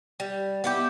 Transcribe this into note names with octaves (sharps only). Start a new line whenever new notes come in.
G3
B3 E4 G4